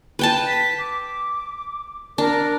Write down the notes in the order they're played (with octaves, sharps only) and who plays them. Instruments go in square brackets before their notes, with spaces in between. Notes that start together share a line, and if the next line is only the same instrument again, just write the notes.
[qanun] B4 G5 A5
[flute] B6
D6
[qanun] D4 [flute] A#4